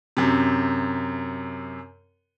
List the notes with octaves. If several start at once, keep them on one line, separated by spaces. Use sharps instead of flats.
F#2 C3